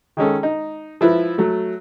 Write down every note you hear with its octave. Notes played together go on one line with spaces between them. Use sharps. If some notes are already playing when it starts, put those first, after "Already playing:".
D#3 G#3 C#4 A4
D#4
F3 E4 B4
F#3 A3